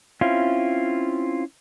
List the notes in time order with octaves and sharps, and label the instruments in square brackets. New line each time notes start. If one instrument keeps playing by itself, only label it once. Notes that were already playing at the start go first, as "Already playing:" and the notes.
[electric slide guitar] C4 C#4 E4 F4